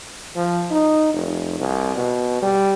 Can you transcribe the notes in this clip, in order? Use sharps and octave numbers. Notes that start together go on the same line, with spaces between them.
F3
D#4
F1
C2
B2
G3